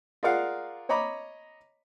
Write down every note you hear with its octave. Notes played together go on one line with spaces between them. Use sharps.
F4 G#4 A#4 D5 F5 F#5
C#5 D#5 A#5 B5 D6